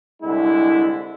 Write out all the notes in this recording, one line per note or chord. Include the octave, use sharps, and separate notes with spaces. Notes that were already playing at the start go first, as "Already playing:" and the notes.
C2 D3 G#3 E4